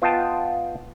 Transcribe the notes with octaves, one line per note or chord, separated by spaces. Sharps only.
B3 F4 D#5 G5 A5